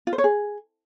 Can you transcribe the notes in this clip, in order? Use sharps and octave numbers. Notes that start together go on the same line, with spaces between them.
F4
C5
C#5
G#4